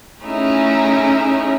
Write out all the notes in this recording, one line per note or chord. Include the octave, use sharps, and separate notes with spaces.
A3 C#4 D#4 E4 G#4